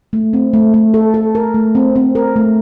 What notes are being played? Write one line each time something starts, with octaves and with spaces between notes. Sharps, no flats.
A3
C4
A3
A3
A4
A4
A#4
A3
C4
C4
A#4
A3